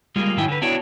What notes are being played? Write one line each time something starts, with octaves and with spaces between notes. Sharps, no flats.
G3 G#3 A#3 F4
G#2 D#3 F#3 E4 G5 G#5
D3 B4
B3 D4 E4 F#4 C#5 G5